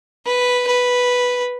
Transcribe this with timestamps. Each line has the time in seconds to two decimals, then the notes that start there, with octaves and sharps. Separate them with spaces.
0.26 B4
0.67 B4